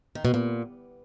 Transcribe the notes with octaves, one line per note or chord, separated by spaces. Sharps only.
D#3
B2
A#2